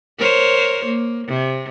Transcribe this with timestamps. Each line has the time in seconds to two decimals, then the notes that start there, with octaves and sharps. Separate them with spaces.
0.19 A#4 C5 C#5
0.85 A#3
1.27 C3